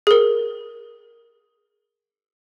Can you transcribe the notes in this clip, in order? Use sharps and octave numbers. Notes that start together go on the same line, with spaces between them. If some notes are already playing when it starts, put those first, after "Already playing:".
G#4 A#4